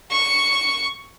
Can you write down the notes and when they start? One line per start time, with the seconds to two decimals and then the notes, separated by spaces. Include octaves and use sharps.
0.11 C#6